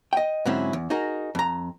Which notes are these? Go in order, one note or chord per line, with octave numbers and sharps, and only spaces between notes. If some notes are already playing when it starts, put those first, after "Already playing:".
D#5 G5
G#2 D3 F#3 C4 C#4 E4
E2
D#4 F#4 G#4 A#4
F2 A#5